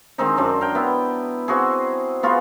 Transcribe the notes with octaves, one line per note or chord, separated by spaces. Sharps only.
D#3 G#3 C4 D#4
F#2 C4 D4
A#4 G5
B3 E4
C4 F#4 G#4
B3 F4 F#4 G#4